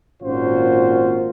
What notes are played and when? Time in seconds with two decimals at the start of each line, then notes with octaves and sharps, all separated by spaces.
0.23 G#1 A#2 C#4 F4 F#4 C5